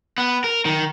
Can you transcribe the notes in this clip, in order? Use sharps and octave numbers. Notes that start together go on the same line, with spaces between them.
B3
A#4
D#3